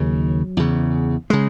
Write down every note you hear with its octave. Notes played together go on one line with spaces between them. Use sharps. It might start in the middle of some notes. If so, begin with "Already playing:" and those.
Already playing: D#2 C#3 F#3
E2 C#3
C#3 G#3